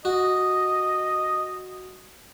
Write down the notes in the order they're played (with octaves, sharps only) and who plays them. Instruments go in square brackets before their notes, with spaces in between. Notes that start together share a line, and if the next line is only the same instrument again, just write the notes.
[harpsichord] F#4 [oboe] D#5